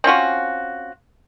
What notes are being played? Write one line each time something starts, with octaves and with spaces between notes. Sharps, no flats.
C4 C#4 F4 F#4